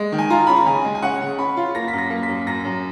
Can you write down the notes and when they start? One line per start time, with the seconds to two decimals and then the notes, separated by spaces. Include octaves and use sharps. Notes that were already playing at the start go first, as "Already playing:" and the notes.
Already playing: G#3
0.12 D#3
0.18 G#5
0.30 F4 A#5
0.47 C#4 B5
0.57 A#5
0.66 C#3 G#5
0.84 G#3
0.95 G#5
1.02 C#4 F#5
1.21 C#3
1.38 C#4 B5
1.57 F4
1.75 A#3 A#6
1.88 B6
1.93 F#2
1.98 A#6
2.10 A#3
2.23 B6
2.29 F#2
2.47 F#2 A#6
2.65 F#2